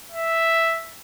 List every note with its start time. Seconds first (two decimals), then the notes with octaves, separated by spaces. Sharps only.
0.12 E5